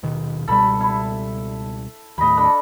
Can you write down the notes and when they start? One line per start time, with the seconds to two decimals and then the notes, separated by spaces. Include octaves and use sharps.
0.03 D#1 B2 D#3
0.48 C#2 B2 G3 A4 B5
0.81 E4
2.18 D#2 A2 D#5 B5
2.37 D4 A4 B5